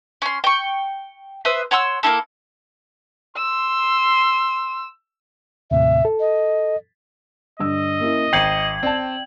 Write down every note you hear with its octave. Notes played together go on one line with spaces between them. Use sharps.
C#4 C6
G5 C#6
B4 C5 E5 D#6
C#5 F#5 C6 E6
A#3 D#4 E4 A4
C6 E6
D#2 A2 C3 E5
A4
D#5
G2 D3 D#5 E6
A#3 C#4 E4
G#1 G5 G6 G#6 C7 C#7 F#7
C4 D5 A5